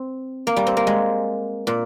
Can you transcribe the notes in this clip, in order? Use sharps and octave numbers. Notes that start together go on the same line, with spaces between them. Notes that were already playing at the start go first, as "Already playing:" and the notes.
Already playing: C4
A#3
G3
C4
A#3
G#3
A#2